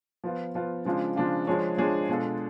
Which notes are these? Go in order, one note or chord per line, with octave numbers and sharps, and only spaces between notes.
F3 B3 F4
F3 B3 F4
C#3 F3 G#3 D4 F4
C#3 F3 G#3 D4 F4
F3 G#3 D4 G#4 C#5
F3 G#3 D4 G#4 C#5
B2 G#3 D4 F4 A4